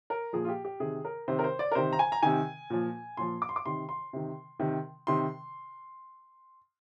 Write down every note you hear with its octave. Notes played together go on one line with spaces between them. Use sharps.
A#4
A#2 F3 G#4
F4
G4
G4
C3 D#3 G#4
A#4
C3 D#3 C5
A#4
C5
D5
A#4
C3 D#3 C5
A#5
G#5
A#5
C3 D#3 G#5
A#2 F3
A#2 F3 C6
D6
C6
D6
C3 D#3 C6
C6
C3 D#3
C3 D#3
C3 D#3 C6